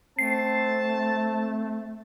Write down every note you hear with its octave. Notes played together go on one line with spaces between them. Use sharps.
A3 C4 A5 C7